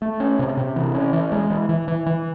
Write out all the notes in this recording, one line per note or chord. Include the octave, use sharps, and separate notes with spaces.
A3
C#4
C3
C3
E3
C#4
E3
G#3
E3
E3
E3
E3